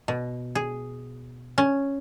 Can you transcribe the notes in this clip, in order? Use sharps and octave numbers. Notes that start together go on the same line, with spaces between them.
B2
G#4
C#4